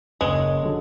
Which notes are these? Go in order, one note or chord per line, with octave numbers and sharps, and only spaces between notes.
F#1 G#3
D3 F#3